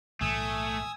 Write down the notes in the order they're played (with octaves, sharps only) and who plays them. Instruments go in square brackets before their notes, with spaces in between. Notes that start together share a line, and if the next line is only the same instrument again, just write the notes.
[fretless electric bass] B1 A2 E3 [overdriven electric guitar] A3 [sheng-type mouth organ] G#5 D#6 E6